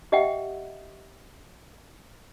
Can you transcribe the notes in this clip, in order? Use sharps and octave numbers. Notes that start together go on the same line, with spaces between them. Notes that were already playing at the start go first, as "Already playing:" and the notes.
G4 D#5 E5 F#5 G5